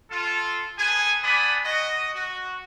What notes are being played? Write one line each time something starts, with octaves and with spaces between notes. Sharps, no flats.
F4 A4
G#4 A4 B4 G#5
B3 D4 D5 G#5 B5 D#6
F#4 D#5
F#4